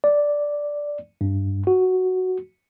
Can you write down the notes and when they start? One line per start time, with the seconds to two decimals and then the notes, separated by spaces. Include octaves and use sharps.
0.04 D5
1.21 G2
1.67 F#4